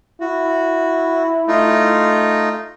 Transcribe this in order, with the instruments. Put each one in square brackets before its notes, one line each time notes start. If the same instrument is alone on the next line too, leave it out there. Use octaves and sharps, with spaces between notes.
[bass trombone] E4 [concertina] F#4
[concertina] A3 D#4 F4